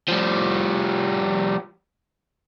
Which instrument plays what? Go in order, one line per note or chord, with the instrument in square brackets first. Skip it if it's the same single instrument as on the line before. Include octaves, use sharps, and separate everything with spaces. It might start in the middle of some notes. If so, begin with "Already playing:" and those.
[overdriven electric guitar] F3 G3